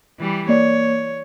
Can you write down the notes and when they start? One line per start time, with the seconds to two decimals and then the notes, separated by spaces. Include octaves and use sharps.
0.20 E3 G3
0.49 A#3 C#5 D5